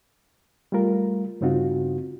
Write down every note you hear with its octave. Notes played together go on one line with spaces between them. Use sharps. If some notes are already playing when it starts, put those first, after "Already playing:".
G3 A3 F4 A#4
G2 C#3 C4 D#4 F4 F#4